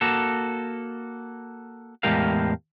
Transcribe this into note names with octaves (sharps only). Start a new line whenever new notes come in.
A#3 F#4 A4
E2 A2 G#3 G4 A#4 F5